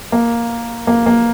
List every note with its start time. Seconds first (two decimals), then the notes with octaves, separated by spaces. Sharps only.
0.12 A#3
0.87 A#3
1.06 A#3